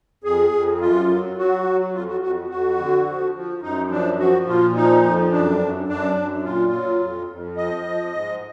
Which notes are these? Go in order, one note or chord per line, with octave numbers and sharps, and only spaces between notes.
F2 G#4
F2
F#2 F4
F#3
F#3 F#4
F#3
F2 F4
F#4
F2 F#4
F2 F#4
D3
F3
F3
F#2 D#4
F3 D4
F3 F#4
A#2 F4
F3 D#4
F2
F#2 D4
F#2
F#2 D4
F#2
A#2 F4
F#3
F2
F2
F3 D#5
F3
G#2